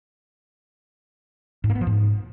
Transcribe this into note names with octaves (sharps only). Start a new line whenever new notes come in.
G#2
A#3
B3
F3
G#2